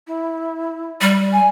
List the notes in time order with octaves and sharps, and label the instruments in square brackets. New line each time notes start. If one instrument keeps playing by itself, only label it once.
[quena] E4
[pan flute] G3
[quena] G#5